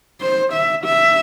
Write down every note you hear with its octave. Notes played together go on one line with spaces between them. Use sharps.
C5
E5
E5